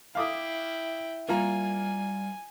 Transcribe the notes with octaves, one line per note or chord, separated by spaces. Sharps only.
E4 F5 G5 D6 D#6
G3 A#3 F4 A#4 G#5